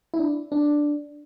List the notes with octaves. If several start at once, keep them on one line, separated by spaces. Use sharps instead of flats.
E4
D4
D4